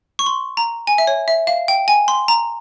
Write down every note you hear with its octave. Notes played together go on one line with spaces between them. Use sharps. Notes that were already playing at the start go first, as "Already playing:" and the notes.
C#6
C6
A#5
G#5
E5
C#5
E5
F5
G5
G#5
C6
A#5